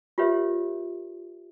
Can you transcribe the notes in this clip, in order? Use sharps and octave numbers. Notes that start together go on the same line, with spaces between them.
F4 G4 A#4 B4 C#5 E5